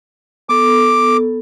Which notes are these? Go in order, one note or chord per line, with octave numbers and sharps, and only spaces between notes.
B3 A4 D6